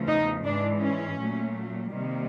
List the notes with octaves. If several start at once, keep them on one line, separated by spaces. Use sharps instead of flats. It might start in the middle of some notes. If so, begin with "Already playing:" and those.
Already playing: E2 C#3 F3 A3
D#4
G#2 E3 G#3 D4
C#4
A#2 F#3 A3
C3 D#3 G3 A#3